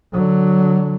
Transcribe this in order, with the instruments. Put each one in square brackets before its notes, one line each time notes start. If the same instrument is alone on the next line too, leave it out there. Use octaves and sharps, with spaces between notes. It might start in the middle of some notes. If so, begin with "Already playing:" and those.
[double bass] D3 F#3